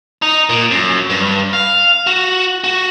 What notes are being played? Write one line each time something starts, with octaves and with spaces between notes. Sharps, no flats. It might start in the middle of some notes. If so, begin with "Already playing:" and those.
D#4
A#2
F#2
G2
F5
F#4
F#4